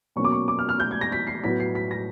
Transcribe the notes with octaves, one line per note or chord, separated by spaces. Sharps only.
B2 F#3 A#3 C#4 C#6
D6
C#6
D6
F6
F6
G6
G#6
A#6
B6
C7
A2 F#3 B3 B6
C7
B6
A#6